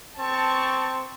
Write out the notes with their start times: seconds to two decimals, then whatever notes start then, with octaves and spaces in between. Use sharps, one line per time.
0.19 C4 A5 C#6